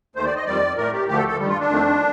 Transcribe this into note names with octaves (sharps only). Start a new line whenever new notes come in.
D#2 D#3 A3 C5
D5
D#5
F2 D#3 G3 D5
A2 A3 A#4
G4
D2 D3 F3 A3 G4
A4
A4
G2 D#3 G3
F4
D4
F2 D#3 A3